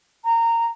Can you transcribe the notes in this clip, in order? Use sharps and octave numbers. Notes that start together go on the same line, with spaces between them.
A#5